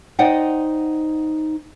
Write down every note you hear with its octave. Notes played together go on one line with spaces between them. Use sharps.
D#4 C5 D5 D#5 F#5 G5